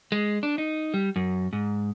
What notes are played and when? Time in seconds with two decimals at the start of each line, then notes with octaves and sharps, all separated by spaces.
0.12 G#3
0.43 D4
0.58 D#4
0.94 G3
1.16 F#2
1.53 G#2